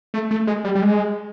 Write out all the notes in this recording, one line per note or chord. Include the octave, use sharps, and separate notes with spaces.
A3
A3
G#3
G3
G3
G#3